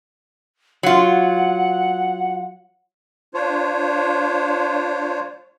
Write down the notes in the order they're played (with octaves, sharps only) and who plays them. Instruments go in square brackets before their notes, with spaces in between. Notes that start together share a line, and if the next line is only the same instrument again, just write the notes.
[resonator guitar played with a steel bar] F#3 F4 [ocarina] F#5
[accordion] D4 F4 C5 C#5